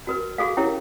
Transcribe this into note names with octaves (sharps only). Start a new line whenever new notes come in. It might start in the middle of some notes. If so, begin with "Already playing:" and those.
F#4 A#4 B4
F#4 G#4 A4 F5
C#4 E4 G4 A#4 C#5